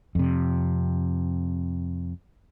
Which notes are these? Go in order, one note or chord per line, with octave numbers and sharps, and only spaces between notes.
F2 C3